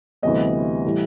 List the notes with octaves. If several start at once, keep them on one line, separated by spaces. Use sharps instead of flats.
D2 C3 E3 G3 B3 D#5
A2 E3 G3